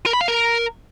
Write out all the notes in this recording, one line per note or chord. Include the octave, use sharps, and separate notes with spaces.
A#4
B5
F5
A#4